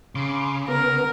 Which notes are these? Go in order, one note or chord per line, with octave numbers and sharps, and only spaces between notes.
C#3 C6 D6
B3 A#4